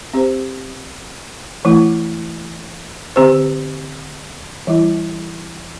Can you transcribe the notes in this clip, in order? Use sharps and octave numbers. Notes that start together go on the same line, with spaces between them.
C4 G4 C5
E3 A3 E4
D3 C4 G4 C5
E3 G3 E4